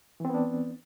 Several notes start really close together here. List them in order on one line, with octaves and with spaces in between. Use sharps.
E3 C4 B3 D4